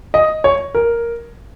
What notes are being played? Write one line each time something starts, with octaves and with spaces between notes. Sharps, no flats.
D#5
C#5
A#4